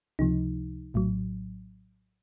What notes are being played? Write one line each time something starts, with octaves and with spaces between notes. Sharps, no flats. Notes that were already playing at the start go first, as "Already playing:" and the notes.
C#2 C3 F3 D#4
A#1 A2 F#3